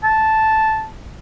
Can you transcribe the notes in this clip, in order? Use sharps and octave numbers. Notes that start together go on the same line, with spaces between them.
A5